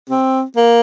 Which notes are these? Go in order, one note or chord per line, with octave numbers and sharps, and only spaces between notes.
C4
A#3